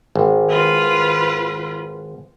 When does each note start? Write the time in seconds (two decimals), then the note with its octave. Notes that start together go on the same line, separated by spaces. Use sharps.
0.16 G#1
0.49 F4 B4